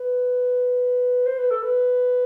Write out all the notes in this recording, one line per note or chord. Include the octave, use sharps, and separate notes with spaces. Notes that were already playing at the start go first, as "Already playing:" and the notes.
Already playing: B4
C5
B4
A4
B4